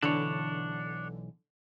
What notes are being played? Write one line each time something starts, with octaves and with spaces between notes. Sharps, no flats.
B1 D3 E3 D4 C#5